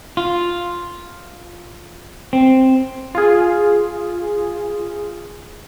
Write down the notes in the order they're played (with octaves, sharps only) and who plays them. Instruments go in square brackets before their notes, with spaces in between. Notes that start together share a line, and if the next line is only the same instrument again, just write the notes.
[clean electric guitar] F4
C4
[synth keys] F4 G#4